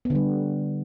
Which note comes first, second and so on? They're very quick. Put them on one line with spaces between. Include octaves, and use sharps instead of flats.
B3 D3 G3